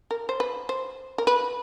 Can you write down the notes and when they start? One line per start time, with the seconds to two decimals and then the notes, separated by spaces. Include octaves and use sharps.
0.11 A#4
0.29 C5
0.40 B4
0.69 C5
1.18 A#4
1.27 B4